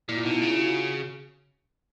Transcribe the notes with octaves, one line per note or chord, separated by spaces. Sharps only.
A#2 E4
F4
B2 D#4
E4
C#3 F4
F#4